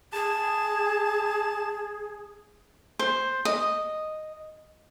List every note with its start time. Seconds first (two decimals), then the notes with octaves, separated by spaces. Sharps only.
0.13 G#4 A5
2.99 C5
3.45 D#5